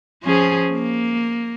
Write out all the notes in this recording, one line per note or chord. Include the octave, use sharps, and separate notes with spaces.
F3 C#4 G#4
A#3